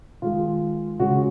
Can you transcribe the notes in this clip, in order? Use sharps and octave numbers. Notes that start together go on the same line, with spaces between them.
D#3 G#3 F4
C#3 G#3 F#4